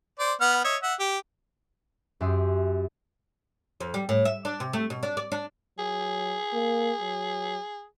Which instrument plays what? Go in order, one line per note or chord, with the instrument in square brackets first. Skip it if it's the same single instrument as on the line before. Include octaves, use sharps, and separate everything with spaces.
[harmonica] C5 D5
B3 F#5 F6
C#5 D#5 E5
E5 F#5
G4
[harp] F#2 G4 E5 C6 D#6
[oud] F2
G3
A2
E5
D4
C3
A3
B2
D4
D5
D4
[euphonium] F#3 [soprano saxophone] G#4
[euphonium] A#3
F#3